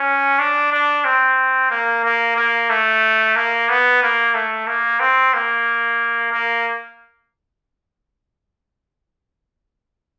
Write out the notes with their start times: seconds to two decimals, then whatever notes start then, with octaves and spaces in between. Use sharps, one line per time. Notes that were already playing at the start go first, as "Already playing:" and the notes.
Already playing: C#4
0.39 D4
0.72 D4
1.05 C4
1.70 A#3
2.04 A#3
2.37 A#3
2.70 A3
3.36 A#3
3.69 B3
4.02 A#3
4.34 A3
4.67 A#3
5.00 C4
5.34 A#3
6.32 A#3